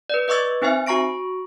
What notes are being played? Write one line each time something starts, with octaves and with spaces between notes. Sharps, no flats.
B4 D5
B4 D#5 C#6 D6 E6 A6
C4 D#4 C5 E5 G#5
F#4 A#5 C#6 A#6 D7